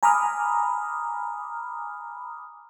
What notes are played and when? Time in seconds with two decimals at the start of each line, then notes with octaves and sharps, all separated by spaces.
0.03 G#5 A#5 B5 D6 D#6 F6